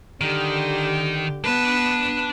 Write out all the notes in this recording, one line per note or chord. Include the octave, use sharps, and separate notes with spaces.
D3 D#3 G4
B3 D4 B4 A5